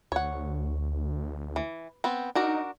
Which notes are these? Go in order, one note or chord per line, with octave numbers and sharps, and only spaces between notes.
D2 C#5 F#5
E3
B3 C4
D4 D#4 F#4 A#4